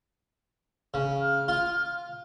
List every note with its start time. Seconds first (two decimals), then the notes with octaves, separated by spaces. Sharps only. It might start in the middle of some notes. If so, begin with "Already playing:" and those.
0.94 C#3
1.21 F6
1.48 F4